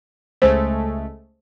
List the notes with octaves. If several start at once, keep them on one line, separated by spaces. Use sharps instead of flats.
C#2 G#3 A3 C5